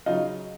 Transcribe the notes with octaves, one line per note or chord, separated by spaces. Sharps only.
C#3 F#3 D#4 F4